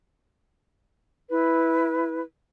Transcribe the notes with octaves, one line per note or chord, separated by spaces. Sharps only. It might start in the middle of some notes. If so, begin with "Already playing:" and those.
E4 B4